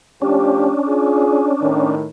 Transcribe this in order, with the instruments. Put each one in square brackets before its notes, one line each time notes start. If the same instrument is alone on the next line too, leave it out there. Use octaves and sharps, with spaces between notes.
[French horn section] F3 A3 G4 [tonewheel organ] C#4 D4
[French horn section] F4 G#4
A2 D#3